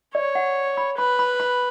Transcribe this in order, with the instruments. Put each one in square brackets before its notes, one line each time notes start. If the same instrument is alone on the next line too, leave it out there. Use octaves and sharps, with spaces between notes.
[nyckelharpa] C#5 [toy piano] D5
[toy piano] F#5
B5
[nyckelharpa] B4 [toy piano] B5
[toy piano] B5
B5